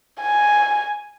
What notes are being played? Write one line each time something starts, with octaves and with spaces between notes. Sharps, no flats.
G#5